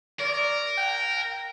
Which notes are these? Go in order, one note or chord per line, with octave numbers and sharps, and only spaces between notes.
A#4 D5
G5